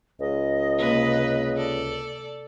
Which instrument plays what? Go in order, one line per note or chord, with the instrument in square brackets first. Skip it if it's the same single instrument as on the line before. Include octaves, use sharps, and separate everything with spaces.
[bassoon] C#2 [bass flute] D#5
[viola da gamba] C3 A#3 B4
A4 D5